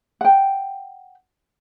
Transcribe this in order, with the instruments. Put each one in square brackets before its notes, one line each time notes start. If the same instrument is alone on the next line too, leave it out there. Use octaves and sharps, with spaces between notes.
[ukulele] F#5 G5